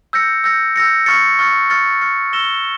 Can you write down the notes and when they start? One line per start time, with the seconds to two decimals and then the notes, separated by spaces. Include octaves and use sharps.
0.13 E6 G6 A#6 C#7
0.44 E6 G6 A#6 C#7
0.76 E6 G6 A#6 C#7
1.06 C#6 F6 A6 C#7
1.39 C#6 F6 A6 C#7
1.70 C#6 F6 A6 C#7
2.01 C#6 F6 A6 C#7
2.33 E6 A#6 E7 G7